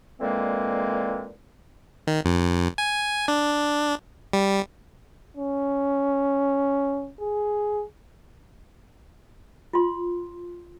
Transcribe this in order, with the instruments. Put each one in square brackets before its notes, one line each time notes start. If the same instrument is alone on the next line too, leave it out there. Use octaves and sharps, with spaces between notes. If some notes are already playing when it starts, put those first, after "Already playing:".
[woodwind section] A#2 D3 E3 G#3 A#3 C4
[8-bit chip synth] D#3
F2
G#5
D4
G3
[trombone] C#4
G#4
[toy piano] F4 C6